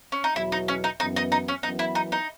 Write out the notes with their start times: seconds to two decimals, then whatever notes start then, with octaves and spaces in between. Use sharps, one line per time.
0.12 C#4
0.24 D#4
0.36 E2 B2 F#3 E4
0.52 D#4
0.68 C#4
0.84 D#4
1.00 F#2 E3 B3 D#4
1.16 D#4
1.32 D#4
1.48 C#4
1.63 F#2 E3 B3 D#4
1.79 E4
1.95 D#4
2.12 D#4